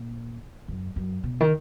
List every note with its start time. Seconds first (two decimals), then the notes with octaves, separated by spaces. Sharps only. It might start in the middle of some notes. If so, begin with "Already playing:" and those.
Already playing: A#2
0.68 F#2
0.96 F#2
1.23 B2
1.41 D#3